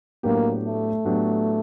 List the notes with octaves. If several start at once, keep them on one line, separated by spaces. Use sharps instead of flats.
A2 F#3 A#3 B3 D4 G4
A3
A2 F#3 B3 D4 G4